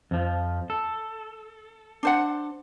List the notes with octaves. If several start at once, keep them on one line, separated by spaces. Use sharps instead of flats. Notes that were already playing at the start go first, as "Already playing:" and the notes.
F2 F3
A4
D4 C5 F#5